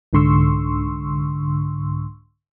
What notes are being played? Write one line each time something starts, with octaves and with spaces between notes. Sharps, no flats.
C2 G#2 D3 C6 C#6 E6